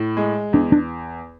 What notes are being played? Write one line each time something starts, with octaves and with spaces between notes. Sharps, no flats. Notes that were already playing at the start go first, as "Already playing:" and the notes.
Already playing: A2
G#3
E2 D4
D4